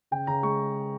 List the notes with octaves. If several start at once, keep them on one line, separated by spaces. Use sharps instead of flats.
C#3 G5
C#3 A#5
G#3 C#6